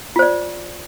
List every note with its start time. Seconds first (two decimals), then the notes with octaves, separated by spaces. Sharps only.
0.16 F4
0.19 C5
0.22 D5